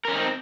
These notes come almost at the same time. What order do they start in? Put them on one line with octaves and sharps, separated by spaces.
A#4 C#4 D#4 C4